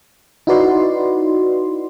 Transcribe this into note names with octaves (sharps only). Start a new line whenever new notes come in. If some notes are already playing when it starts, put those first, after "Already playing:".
D#4 E4 F#4 B4 D5 C6